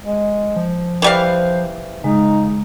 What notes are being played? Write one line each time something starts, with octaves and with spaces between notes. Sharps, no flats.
G#3
F3
E3 G3 C5 F5
C#3 G#3 D#4